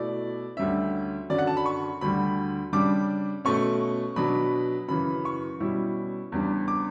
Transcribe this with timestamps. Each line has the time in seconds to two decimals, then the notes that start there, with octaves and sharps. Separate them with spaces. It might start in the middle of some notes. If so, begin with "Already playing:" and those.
Already playing: B2 A3 E4 D5
0.57 D2 D3 G3 C#4 E5
1.30 F#2 D3 F#3 C#4 D5
1.38 F#5
1.47 A5
1.57 B5
1.66 C#6
2.01 D2 D3 G3 B5
2.73 C#3 G3 D4 D6
3.45 B2 A3 C#4 C#6
4.16 B2 F#3 B3 D4 B5
4.88 F#2 C#3 E3 B5
5.25 C#6
5.60 B2 G3 C#4 E4
6.32 E2 C#3 G3 D4
6.68 D6